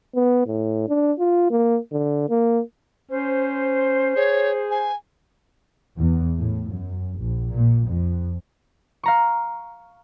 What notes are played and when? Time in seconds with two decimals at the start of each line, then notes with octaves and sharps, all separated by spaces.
0.15 B3
0.46 A2
0.88 D4
1.19 F4
1.51 A#3
1.92 D3
2.29 A#3
3.11 C#4 C5
4.16 G#4 C#5
4.71 G#5
5.97 E2
6.38 A2
6.71 F#2
7.19 A#1
7.53 A#2
7.87 F2
9.03 F5 A#5 C#6